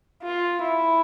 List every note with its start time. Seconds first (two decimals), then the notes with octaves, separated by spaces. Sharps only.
0.23 F4
0.62 E4